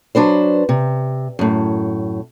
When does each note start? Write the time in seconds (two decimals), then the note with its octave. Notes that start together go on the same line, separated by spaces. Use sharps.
0.15 F#3 D4 B4 C5
0.69 C3
1.39 F#2 A2